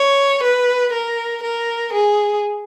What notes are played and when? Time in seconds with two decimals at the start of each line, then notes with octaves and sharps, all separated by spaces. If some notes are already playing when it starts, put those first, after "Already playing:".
Already playing: C#5
0.43 B4
0.93 A#4
1.43 A#4
1.93 G#4